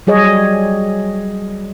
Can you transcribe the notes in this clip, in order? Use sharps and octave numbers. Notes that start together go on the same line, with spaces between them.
F#3 G3 G#4 C#5 D#5